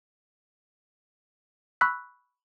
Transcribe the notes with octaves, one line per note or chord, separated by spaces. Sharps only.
B5 C#6 E6 F#6 B6